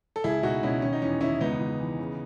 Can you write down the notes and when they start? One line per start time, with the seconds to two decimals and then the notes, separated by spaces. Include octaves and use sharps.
0.16 A4
0.24 C#2 E4 G#4
0.43 B2 D#4 F#4
0.63 B2 C#4 E4
0.82 D#3 C#4
0.93 D#4
1.02 E2 C#4
1.21 D#3 C#4 E4
1.41 C#2 B3 D#4
1.60 C#2
1.80 E3
1.99 C#3